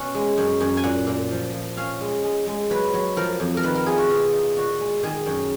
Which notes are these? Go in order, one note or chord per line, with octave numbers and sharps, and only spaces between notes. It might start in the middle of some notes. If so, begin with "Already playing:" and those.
Already playing: B2 C#4 F#5
G#3
F#2
F#2
G#5
A#2 F#5
A#2
F3
F3
C#4 F5
G#3
G#3
G#3
F#3 B4
F#3
F3 A#4
F2
A#4
D#3 B4
A#4
F4 G#4
F#4
B2 F4
D#4
A#2 F#4
G#3
D#3 G#4
F#2